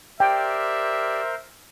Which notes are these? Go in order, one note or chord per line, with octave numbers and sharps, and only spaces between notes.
G4 A#4 C5 D5 E5 G5